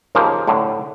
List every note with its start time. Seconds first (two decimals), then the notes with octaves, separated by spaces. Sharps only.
0.15 D#2 C#3 F3 A#3
0.47 A2 D3